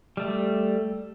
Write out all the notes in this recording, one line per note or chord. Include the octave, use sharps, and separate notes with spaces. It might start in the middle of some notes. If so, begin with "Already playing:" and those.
G3 A3